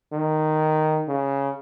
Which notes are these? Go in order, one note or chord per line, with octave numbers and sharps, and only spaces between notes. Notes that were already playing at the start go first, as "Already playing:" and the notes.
D#3
C#3